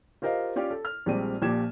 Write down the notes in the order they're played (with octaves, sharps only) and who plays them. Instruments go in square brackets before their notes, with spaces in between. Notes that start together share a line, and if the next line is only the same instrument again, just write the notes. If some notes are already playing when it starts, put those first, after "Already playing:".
[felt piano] F4 G4 A#4 C5 D#5 F5
C#4 F4 G4 C#5 D5
A4
F6
A#1 G3 G#3 C4 D5 D#7
A#1 A#2 F3 G4 G#6 E7